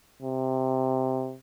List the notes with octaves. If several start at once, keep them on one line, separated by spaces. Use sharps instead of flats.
C3